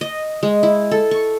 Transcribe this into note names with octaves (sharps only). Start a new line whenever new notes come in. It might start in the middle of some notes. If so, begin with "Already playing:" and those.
D#5
G#3
E4
A4
C#6